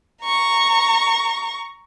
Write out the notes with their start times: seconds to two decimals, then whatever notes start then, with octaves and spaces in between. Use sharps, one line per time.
0.22 A#5 C#6